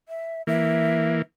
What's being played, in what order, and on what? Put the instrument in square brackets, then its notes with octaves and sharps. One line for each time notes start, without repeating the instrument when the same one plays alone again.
[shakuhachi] E5
[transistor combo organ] E3 A#3 [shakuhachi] E5